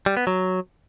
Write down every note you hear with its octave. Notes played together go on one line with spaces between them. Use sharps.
G3
B3
F#3